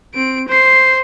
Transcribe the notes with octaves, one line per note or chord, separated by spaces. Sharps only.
C4 D7
C5 C7